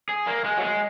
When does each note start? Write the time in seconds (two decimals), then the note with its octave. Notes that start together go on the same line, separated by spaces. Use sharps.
0.09 G#4
0.27 A#3
0.44 G#3
0.58 F#3
0.62 G#3